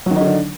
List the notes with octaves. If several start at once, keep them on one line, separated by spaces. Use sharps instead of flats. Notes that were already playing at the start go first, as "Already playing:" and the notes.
D3 D#3 F#3 D4 D#4